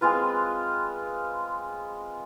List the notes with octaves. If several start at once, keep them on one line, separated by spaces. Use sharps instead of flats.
G#3 C4 F4 B4